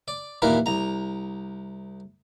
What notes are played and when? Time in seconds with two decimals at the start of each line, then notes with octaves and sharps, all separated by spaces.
0.08 D5
0.42 D#2 A#2 E3 A#4 B4
0.66 C2 A#5